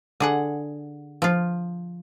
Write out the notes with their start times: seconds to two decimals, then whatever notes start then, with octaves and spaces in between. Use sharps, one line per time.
0.20 D3 G#4 F#5
1.22 F3 F4